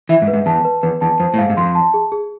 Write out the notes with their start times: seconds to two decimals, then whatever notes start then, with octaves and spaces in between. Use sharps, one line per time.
0.09 E3 E5
0.22 G#2
0.28 B4
0.33 G#2
0.46 E2 A5
0.65 B4
0.83 E2 B4
1.01 E2 A5
1.20 F2 C5
1.34 A2
1.38 G#2 F5
1.50 G#2
1.57 F2 C6
1.75 A5
1.94 G#4
2.12 G#4